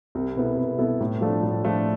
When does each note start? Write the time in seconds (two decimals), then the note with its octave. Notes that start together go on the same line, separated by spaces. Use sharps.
0.15 C2
0.36 B2 B3 E4 A4
0.57 C2
0.78 B2 B3 E4 A4
1.00 A2
1.21 F3 A3 D4 A4
1.43 A2
1.64 F3 A3 D4 A4